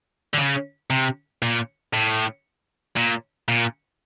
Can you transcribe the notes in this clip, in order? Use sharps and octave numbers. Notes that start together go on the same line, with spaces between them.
D3
C#3
C3
A#2
A2
A#2
A#2